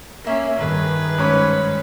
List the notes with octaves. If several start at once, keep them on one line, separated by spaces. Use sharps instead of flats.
A#3 C#4 A#4 E5
G2 D#3 G#4 B4
G#2 C#4 B5